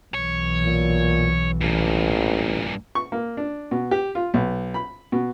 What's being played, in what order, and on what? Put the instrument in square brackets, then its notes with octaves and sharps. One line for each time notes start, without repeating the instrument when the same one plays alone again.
[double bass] B1 E3 [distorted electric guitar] C#5
[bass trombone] A#2
[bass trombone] A1 [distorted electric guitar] G2 A#2
[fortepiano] C#6
A#3
D4
B2
G4
F4
B1
B5
B2